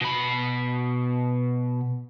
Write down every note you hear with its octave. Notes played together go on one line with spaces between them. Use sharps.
B2 B5